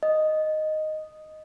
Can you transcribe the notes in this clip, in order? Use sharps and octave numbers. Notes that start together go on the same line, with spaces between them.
D#5